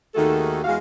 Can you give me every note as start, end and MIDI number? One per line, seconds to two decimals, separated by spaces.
0.15 0.59 39
0.15 0.59 51
0.15 0.59 57
0.15 0.59 66
0.15 0.59 68
0.15 0.59 69
0.64 0.77 40
0.64 0.77 56
0.64 0.77 66
0.64 0.77 77